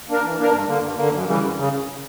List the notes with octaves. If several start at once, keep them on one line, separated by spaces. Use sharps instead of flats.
A#3 D4 A#4
E3
A#3 D4 A#4
G2
D3 A#3
G2
D3 A#3
F#2
C#3 E3 G3
F#2
C#3